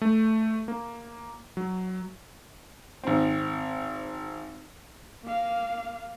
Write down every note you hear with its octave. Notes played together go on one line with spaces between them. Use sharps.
A3
A#3
F#3
G#1 C4
A#3 F5